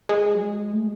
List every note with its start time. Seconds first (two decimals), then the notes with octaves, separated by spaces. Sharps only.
0.09 G#3
0.34 F#3
0.41 G#3
0.73 A3